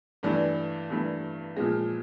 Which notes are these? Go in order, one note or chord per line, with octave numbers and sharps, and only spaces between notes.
G2 E3 A3 D4
G2 E3 A3 D4
A#2 F3 G#3